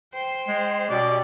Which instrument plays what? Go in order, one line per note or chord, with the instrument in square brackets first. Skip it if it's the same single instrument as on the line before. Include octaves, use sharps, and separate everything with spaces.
[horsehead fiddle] C5 G5
[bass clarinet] G#3
[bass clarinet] B2 [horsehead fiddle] C#4 G4 [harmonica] D5